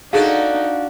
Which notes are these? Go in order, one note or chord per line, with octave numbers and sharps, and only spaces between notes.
D4 D#4 F#4 G#4 A4 D5 F5